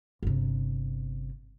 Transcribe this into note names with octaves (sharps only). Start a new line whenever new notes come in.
G1 C3